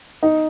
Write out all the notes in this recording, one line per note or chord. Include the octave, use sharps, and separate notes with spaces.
D#4